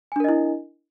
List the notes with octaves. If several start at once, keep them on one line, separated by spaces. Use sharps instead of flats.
D4 E4 A#4 D#5 G#5